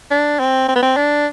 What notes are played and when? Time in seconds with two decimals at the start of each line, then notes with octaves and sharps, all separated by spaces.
0.11 D4
0.39 C4
0.68 C4
0.75 B3
0.82 C4
0.97 D4